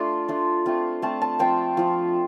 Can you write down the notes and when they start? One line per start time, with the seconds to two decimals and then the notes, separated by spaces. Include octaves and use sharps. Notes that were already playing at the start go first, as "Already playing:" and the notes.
Already playing: A3 D4 F4 C6
0.28 A3 D4 F4
0.66 A3 C4 F4
1.02 A3 C4 F4 A5
1.22 A5
1.39 F3 C4 F4 G5
1.77 F3 C4 F4